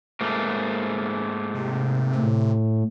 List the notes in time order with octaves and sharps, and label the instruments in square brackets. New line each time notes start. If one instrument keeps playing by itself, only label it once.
[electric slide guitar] G#2 A3 A#3
[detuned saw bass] C3
[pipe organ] A2